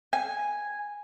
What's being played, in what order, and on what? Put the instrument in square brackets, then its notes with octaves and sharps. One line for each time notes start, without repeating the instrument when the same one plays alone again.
[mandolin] G#5